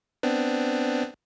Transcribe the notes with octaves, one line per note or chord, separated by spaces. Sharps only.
B3 C4 D4